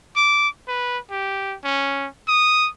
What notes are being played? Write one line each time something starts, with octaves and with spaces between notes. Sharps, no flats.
D6
B4
G4
C#4
D#6